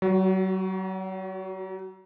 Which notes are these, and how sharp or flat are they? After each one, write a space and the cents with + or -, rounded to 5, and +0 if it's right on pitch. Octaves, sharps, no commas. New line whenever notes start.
F#3 +40 F#4 +0